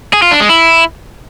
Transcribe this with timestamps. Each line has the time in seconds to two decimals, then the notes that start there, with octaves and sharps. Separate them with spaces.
0.13 G#4
0.22 F4
0.31 D4
0.40 G#3
0.49 E4